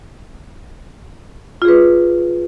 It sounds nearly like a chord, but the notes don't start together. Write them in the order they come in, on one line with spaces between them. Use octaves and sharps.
F4 G#4 B4